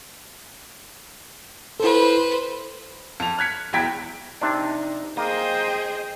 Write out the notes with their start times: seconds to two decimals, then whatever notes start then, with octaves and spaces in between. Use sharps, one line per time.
1.80 E4 A4 B4 C5
3.20 F2 F7
3.38 F6 F#6 G#6 B6 C#7
3.73 E1 E2 E4 G5 G#6 B6
4.41 C3 D4 D#4
5.17 A#3 G#4 C5 D#5 G5